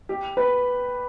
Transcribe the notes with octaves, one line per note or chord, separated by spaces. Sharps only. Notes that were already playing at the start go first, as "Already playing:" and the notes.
G4
B4